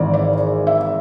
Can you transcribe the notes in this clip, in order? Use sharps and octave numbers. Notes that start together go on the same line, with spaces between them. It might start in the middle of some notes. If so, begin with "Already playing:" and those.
Already playing: G#1 G#2 E3 D5
D5
E5